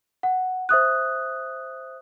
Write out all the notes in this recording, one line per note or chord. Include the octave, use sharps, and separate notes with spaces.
F#5
C5 E5 D#6 F#6